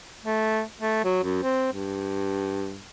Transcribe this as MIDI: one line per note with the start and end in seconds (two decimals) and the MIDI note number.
0.23 0.62 57
0.80 1.01 57
1.04 1.22 54
1.23 1.39 42
1.43 1.68 60
1.73 2.88 43